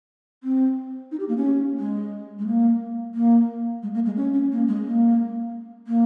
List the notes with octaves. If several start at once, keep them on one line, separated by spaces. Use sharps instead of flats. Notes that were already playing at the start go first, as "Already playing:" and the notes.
C4
D#4
G4
A#3
C#4
G#3
G#3
A#3
A#3
G#3
A#3
G#3
C#4
C#4
A#3
G#3
A#3
A#3